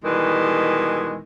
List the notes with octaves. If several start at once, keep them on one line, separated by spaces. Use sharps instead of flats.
B2 D#3 E3 G3 G#3